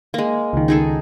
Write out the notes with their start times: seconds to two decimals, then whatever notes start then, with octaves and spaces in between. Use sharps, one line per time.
0.14 G#3 A#3
0.53 C#2 D#3
0.68 D#4 G#4 A4